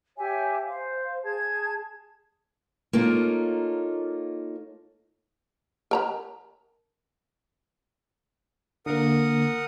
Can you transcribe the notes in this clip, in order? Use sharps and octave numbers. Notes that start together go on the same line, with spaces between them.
G4 C#5 E5 G#5
C5 F5
G#4 A5 G#6
A#3 C#4 D#4 F4 A4 A#4
A#4 A#5 B5
D3 A#3 A#4 F#5 D#6